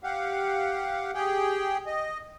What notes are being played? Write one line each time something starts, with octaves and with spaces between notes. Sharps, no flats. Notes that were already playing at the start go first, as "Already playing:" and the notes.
G4 F5 F#5
G4 G#4 G5
D#5